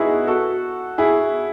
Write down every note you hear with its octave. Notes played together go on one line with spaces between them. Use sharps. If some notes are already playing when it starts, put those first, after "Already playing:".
Already playing: B3 D#4 E4 F#4 G#4
F#4 A4
E4 G#4